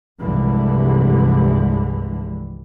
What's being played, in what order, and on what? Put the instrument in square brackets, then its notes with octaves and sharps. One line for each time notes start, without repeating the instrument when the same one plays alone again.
[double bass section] F1 C2 G2 D3 E3 G#3